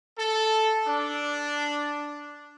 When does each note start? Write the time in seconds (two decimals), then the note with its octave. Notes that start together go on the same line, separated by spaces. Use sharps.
0.18 A4
0.87 D4